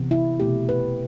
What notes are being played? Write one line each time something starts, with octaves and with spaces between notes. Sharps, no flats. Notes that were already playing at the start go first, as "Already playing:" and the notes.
Already playing: C3 E3 B3
E4
B2 A3 C4 G4
B4